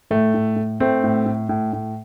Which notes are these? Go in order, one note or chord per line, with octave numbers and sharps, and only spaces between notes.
A2 A3
A2
A2
A2 A3 C4
A2
A2
A2
A2